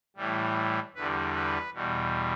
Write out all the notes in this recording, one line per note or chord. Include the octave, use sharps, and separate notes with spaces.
A2 E3 G3
E2 D3 G3 B4
B4
E2 B2 G3